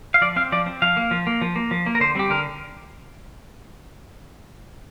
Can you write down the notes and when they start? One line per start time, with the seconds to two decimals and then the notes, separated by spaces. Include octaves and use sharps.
0.14 F5
0.21 F3 D5
0.36 C4 F5
0.52 F3 D5
0.66 C4
0.82 F3 F5
0.97 A#3
1.11 F3
1.27 A#3
1.41 F3
1.56 A#3
1.71 F3
1.86 A#3
1.95 A#4
2.00 D3 C5
2.15 G3 C4 G4
2.30 D3 A#4